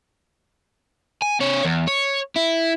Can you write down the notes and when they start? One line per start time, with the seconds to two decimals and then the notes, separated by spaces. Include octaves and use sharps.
1.22 G#5
1.41 C3 C#5
1.65 E2
1.87 C#5
2.36 E4